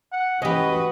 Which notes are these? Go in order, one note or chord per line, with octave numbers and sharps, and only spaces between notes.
F#5
E3 C#4 F#4 G4 B4 D#5